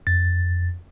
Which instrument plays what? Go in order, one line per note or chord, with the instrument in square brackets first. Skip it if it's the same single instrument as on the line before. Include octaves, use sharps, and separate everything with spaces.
[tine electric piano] F2 A6